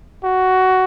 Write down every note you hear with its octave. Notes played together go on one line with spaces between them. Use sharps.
F#4